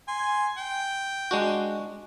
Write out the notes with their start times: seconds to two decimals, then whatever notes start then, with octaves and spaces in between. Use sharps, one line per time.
0.08 G#5 C6
0.57 G5
1.31 G#3 D4 F#4